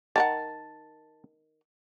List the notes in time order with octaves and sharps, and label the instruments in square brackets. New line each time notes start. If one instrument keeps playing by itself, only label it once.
[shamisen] D#3 A#4 F#5 [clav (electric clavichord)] A5